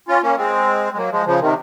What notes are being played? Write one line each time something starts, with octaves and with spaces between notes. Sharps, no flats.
C#4 F4
A#3 C#4
G#3 C4
G#3
F#3 A#3
F3 G#3
C#3 F3
C3 D#3